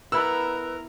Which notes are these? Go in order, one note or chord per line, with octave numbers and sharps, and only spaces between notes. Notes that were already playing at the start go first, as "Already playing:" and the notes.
B3 E4 A#4 B4 F#5 A#5 E6